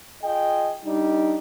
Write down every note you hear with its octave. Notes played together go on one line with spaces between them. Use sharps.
F4 G#4 D#5 G5
G3 D4 D#4